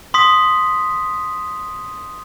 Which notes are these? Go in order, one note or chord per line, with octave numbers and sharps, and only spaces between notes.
C6 D#6 B6